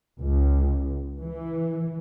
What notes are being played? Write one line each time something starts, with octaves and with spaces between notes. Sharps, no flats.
C#2
E3